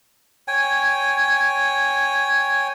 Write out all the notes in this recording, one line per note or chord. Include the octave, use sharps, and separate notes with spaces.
C#5 G5 G#5